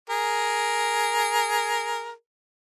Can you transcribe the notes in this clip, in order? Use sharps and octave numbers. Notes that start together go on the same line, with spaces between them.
G#4 A#4